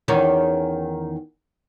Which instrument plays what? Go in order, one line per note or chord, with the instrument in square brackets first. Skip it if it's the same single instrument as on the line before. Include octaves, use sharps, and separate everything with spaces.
[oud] E2 D#3 C#4